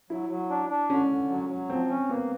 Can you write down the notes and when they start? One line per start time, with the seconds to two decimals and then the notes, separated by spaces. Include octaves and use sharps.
0.10 F#3 E4
0.30 F#3
0.50 D4
0.69 D4
0.90 D3 C#4
1.09 D3
1.30 F#3
1.49 F#3
1.70 F3 C4
1.89 C#4
2.10 A#3 B3